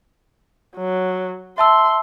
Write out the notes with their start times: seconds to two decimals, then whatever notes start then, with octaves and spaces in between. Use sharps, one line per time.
0.77 F#3
1.58 E5 A5 C6 E6